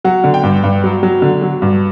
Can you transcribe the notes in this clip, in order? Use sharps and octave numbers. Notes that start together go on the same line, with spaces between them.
F#3 F#5
D3
G5
G2
G2
F#3
F#3
D3
F#3
G2